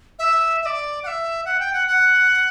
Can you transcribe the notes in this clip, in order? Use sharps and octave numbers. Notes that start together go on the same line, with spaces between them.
E5
E5
D5
F#5
E5
F#5
G5
F#5
F#5